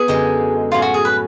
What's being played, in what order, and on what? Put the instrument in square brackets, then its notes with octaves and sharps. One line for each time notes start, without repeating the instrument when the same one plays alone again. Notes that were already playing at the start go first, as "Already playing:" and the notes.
Already playing: [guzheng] B3 [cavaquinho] G#4
[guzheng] F#2 D3 G#3
[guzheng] A2 F#3 C#4 [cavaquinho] F4
[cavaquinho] F#4
G#4
B4